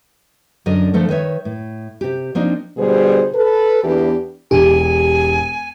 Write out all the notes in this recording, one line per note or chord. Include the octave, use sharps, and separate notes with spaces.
F#2 D3 A#4 D#5
D3 F3 A3 A4 A#4
D#3 B4 C#5 E5
A2
C3 G4
F3 A#3 C4 D4 D#4 F4
B2 D3 G3 G#4 C5
A4 B4
E2 E3 B3 D4 G4
E1 G4 G#5